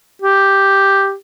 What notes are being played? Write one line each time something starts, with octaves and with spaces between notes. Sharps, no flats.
G4